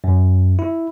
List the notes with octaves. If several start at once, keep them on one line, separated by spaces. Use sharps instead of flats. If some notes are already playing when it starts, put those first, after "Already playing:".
F#2
E4